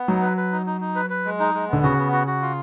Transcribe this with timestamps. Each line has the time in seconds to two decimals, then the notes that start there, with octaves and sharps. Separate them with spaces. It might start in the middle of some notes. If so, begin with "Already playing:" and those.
Already playing: B3
0.08 F#3 D#4
0.22 B4
0.37 B4
0.52 D#4
0.66 D#4
0.81 D#4
0.95 B4
1.10 B4
1.25 G#3
1.40 D#4
1.54 G#3
1.69 D3 B3
1.83 C#3 F#4
1.98 B3
2.13 F#4
2.27 F#4
2.42 F4